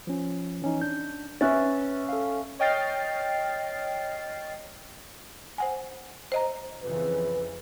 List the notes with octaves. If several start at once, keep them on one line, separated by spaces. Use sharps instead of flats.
F3 C#4
E3 C#4 D#4
D4 G6
C#4 B4 E5 F#6 A6
A4 F5
C#5 D#5 G5 F6 A6 C7
C5 F#5 G#5
C5 D#5 A#5
F2 C#3 E3 B4